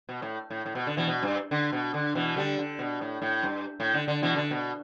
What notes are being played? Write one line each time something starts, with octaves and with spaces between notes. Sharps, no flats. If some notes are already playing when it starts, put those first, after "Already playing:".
B2
A2
A2
A2
B2
D3
B2 E3
B2
G2
D3
B2
D3
B2 E3
D3 G3
D3
B2
A2
A2
G2
A2
D3
D3
B2 E3
D3
B2